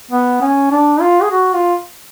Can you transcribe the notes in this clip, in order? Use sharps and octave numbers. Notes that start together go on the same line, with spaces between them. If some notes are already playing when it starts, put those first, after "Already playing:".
B3
C#4
D4
F4
G#4
F#4
F4